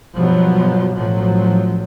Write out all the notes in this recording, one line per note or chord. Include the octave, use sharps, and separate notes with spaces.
G2 B2 F3 F#3
A1 F3 F#3